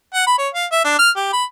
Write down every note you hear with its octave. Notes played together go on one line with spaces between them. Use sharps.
F#5
B5
C#5
F5
E5
D4
F6
G4
B5